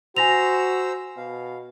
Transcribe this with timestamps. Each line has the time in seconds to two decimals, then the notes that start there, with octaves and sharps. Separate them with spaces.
0.17 F#4 C5 G#5 A#5 E6 A#6 F7
1.17 B2 F5